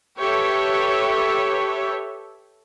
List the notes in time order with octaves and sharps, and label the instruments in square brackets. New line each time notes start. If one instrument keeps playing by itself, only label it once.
[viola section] G4 A4 B4 C#5 E5